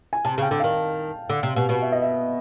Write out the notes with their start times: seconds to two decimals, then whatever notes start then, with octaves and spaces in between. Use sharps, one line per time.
0.13 G#5
0.25 C3 A5
0.38 C#3
0.42 G5
0.51 D3
0.60 D#3 F5
1.29 D3
1.43 C3
1.56 B2
1.69 B2
1.82 E5
1.92 D#5
2.02 E5